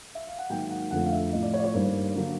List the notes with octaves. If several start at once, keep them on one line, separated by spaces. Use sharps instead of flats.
E5
F5
F#5
G#2 D#3 F#3 A#3 G5
F#5
F2 D3 F3 A3 F#5
F5
E5
A2 F3 A3 D#5
D5
C#5
D5
C#5
G2 D#3 G3 A#3 C5
D3 F#3 A#3